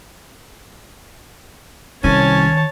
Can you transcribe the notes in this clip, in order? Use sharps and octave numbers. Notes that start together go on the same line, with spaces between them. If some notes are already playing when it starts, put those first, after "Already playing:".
C2 D#3 C#4 C#5 G#5 A5